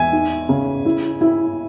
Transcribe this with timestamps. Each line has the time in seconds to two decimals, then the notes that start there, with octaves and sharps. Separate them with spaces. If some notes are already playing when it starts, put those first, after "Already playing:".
Already playing: E2 E5 G#5
0.13 D#4
0.49 C#3
0.85 E4
1.21 E4